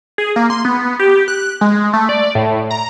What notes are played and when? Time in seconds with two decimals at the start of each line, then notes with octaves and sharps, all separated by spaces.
0.18 G#4
0.36 A#3
0.50 C6
0.65 B3
0.99 G4
1.28 F#6
1.61 G#3
1.93 A3
2.09 D5
2.35 A2
2.71 A#5